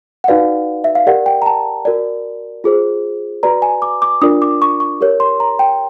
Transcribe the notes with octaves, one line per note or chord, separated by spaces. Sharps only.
F#5
D#4 F#4 B4 D5 F5
E5
F5
G4 A#4 D5 F#5
G5
A#5
A5
F#4 A#4 D5
F4 G#4 C5
F#4 B4 D5 A#5
G#5
D6
D6
D4 F4 A#4 D5 D#6
D6
C#6
C#6
G4 A#4 C#5
C6
A#5
G5